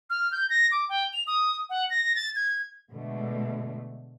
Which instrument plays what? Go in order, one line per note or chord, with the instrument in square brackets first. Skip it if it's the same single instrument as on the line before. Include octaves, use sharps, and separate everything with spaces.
[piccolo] F6
G6
A#6
D6
G5
F7
D#6
F#5
A#6
A6
G#6
[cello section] B2 D3 G#3 A3